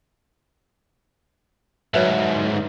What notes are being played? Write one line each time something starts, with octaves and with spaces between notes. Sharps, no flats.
D2 G#2 F#3 B4 E5